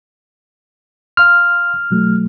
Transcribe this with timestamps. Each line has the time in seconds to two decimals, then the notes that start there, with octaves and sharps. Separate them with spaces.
1.17 F5 C6 F6
1.91 B2 F#3 A3